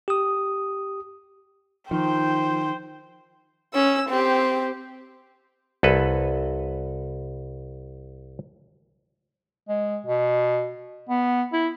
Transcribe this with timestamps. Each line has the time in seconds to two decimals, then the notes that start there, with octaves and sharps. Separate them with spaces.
0.08 G4 D#6
1.91 D#3 F3 C5 G5
3.74 C#4 E6
4.09 C4 G4
5.83 C2 A4 B4
9.69 G#3
10.06 B2
11.09 B3
11.53 E4